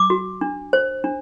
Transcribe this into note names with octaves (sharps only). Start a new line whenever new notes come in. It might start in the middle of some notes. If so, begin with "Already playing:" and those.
Already playing: D6
F#4
D4
C5
D4